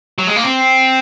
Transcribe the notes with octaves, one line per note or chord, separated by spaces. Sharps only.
F#3
G#3
A#3
C4